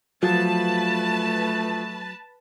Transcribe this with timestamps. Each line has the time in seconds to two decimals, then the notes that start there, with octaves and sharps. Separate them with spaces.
0.23 F3 F#3 A3 B4 A5